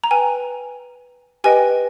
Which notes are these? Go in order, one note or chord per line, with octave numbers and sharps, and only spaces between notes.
A#5
B4 G5 G#5
G4 B4 D#5 G5 G#5